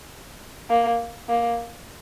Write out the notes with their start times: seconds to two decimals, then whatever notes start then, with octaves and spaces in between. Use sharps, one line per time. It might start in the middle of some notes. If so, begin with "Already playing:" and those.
0.70 A#3
1.29 A#3